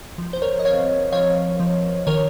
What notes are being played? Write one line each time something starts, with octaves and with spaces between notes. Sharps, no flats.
F3
C5
A#4 C#5
D#5
C4 C#5 F5
F3 C#5 F5
F3
D#3 A#4 C#5